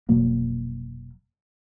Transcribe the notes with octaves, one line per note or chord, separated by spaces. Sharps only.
F1 B2 F#3 A#3